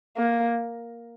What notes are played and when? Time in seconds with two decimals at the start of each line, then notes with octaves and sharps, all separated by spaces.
0.17 A#3